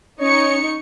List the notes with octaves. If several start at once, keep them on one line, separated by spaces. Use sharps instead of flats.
C#4 D#4 C#5 C#6 C#7